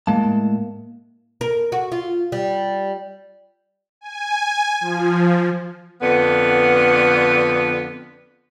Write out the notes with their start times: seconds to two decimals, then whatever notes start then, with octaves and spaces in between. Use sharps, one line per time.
0.07 A2 G#3 A#3 A5
1.41 A#4
1.72 F#4
1.92 F4
2.32 G3
4.01 G#5
4.81 F3
6.01 F2 D3 B3